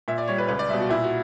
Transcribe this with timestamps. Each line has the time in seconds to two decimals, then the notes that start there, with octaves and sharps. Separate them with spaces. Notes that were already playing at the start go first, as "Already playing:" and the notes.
0.08 A#2 E5
0.18 D5
0.28 G3 C#5
0.38 B4
0.48 C#2 B4
0.59 D5
0.69 B2 G3 E5
0.80 F#4
0.89 A#2 E4
1.04 F#4